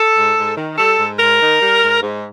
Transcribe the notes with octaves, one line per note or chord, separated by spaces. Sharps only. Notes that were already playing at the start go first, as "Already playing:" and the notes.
Already playing: A4
G#2
G#2
D#3
G3 A4
G#2
G#2 A#4
D#3
G3
G#2
G#2